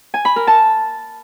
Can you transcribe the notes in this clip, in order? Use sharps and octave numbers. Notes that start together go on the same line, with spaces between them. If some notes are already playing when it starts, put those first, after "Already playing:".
G#5
B5
A#4
A5